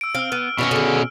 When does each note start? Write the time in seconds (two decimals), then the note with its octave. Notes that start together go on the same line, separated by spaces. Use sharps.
0.01 E6 D7
0.15 C4 F5 F6 D7
0.32 B3
0.58 B2 C#4 F#4 D5 E5
0.71 D3 G#4